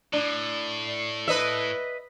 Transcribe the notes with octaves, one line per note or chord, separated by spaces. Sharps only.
A2 D4
B4 D#5 E5